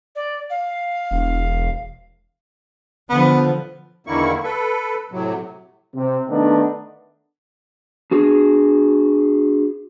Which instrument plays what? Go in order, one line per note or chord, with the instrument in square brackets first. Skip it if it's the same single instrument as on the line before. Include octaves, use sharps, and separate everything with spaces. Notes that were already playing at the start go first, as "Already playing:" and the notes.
[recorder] D5
F5
[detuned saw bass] E1
[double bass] D3 F3 [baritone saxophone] B3
[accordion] E2 D3 D#3 A#3 E4 C#6
A4 B4
A2 C3 F#3
[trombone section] C3
D#3 A3 B3 D4 D#4
[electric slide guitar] D4 F#4 G#4